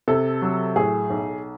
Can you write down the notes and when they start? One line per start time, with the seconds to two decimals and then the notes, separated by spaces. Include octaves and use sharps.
0.08 C3 A4
0.42 F#3
0.76 A2 G#4
1.10 B1